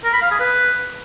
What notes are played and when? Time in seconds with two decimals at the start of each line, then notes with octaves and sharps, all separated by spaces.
0.04 A#4
0.13 B5
0.22 F5
0.31 G#4
0.40 B4